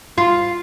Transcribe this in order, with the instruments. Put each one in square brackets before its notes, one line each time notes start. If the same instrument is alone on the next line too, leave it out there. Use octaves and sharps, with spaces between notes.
[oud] F4